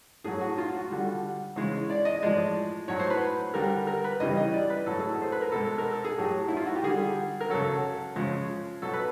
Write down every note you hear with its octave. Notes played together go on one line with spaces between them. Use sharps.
A2 F#3 G#4
F#4
F4
F#4
D3 G3
C#3 E3 G#3
D5
D#5
A2 F3 G#3 D5
A2 F#3 C#5
C5
B4
D3 G3 A#4
A#4
B4
C#3 E3 G3 D#5
D#5
D5
B4
A2 F#3 A4
G#4
A4
C5
B4
A#4
B2 G#3 A4
A#4
A4
G#4
A2 F#3 G4
E4
F4
F#4
G4
D3 G3 G#4
A#4
C#3 F#3 A4
C#3 F3 G#3
B2 F#3 A4
B4